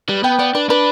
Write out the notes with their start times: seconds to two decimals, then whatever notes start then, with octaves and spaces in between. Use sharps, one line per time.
0.08 G3 B4
0.24 B3 G5
0.39 B3 D5
0.55 D4 B4
0.69 D4 B4